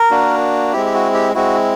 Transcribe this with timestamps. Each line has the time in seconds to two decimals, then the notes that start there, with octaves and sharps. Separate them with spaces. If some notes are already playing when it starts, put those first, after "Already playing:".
Already playing: A#4
0.11 A#3 D4 F#4
0.72 G#3 C4 E4 G4
0.86 G4
0.94 F#4
1.14 G4
1.34 G#3 C4 E4 F#4